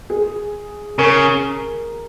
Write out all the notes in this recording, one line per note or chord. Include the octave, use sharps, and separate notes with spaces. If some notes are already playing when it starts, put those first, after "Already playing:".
G#4
C#3 A#4